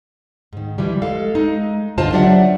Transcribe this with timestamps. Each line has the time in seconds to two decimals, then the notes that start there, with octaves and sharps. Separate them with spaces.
0.53 G#2 D#3
0.78 E3 F3 G3
1.02 G#3 A4 F5
1.35 G#3 D#4
1.98 G2 D3 F4 C5 D#5 A5
2.12 F#3 D4 G4 D5 E5 F#5